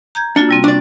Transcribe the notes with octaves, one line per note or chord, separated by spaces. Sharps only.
A#5 G6 G#6
A#3 D4 F4 F#4
C3 G3 C4
D4 D5 C#6